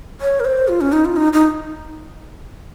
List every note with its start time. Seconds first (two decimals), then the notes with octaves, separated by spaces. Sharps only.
0.21 C#5
0.40 A#4
0.45 C5
0.68 F4
0.81 C#4
0.92 D#4
1.05 F4
1.16 D#4
1.33 D#4